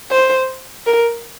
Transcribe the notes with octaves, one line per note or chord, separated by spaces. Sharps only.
C5
A#4